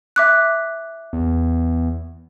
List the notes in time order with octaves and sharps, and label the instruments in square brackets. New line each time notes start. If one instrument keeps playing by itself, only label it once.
[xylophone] E5 D6 F#6
[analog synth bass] E2